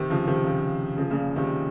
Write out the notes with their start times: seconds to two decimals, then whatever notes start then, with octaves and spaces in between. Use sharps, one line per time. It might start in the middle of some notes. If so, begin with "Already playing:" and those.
Already playing: C3 D#3
0.10 C#3 F3
0.27 C3 D#3
0.45 C#3 F3
0.97 C#3 F3
1.10 A#2 C#3
1.36 C3 D#3